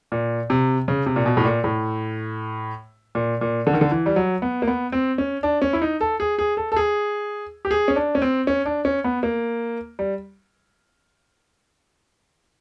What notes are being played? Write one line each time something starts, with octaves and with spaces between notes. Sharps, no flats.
A#2
C3
C#3
C3
A#2
B2
A2
A#2
A2
A#2
A#2
D3
D#3
D3
E3
G3
F#3
B3
A#3
B3
C4
C#4
D4
C#4
E4
D#4
A4
G#4
G#4
A4
A4
G#4
G4
G#4
C#4
D4
C#4
C4
C#4
D4
C#4
B3
A#3
G3